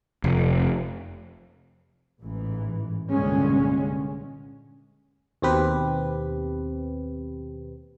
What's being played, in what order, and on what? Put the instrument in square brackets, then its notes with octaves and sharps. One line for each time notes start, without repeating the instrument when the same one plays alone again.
[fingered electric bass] F1
[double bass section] A1 G#2 E3
C2 G2 A#2 D3 G#3 C#4
[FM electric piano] D#2 B2 C4 G4 B4